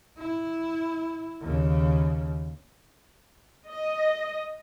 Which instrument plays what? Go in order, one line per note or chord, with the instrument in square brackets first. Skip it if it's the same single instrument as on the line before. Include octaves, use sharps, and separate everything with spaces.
[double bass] E4
D#2 C#3
[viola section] D#5